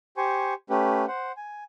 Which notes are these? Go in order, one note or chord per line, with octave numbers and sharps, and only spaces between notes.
G4 C5 G#5 C#6
A3 C#4 G4 B4
C5 F#5
G#5